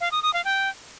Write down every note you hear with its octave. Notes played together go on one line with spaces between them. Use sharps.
F5
D#6
D#6
F5
G5